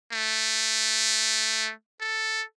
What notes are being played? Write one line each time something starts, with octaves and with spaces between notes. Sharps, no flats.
A3
A4